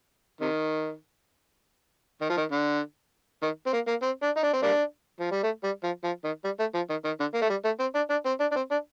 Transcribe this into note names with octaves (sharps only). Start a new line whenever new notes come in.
C3 D#3
D#3
F3
D#3
D3
D#3
C4
A#3
A#3
C4
D4
D#4
D4
C4
G3 A#3 D4
F3
G3
A3
G3
F3
F3
D#3
G3
A3
F3
D#3
D#3
D3
A#3
A3
G3
A3
C4
D4
D4
C4
D4
D4
C4
D4